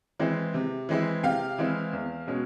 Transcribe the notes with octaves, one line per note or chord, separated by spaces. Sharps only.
E3 G#3 C4 E4
C3
E3 G#3 C4 E4
C3 F5 G5
E3 G#3 C4 E4
E2
B2 G#3 C#4